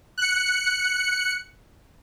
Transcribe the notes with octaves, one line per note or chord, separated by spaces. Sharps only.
F#6 C#7